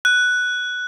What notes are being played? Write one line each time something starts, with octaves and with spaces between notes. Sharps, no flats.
F#6